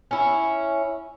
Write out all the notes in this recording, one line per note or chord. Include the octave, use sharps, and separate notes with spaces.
C#4 E4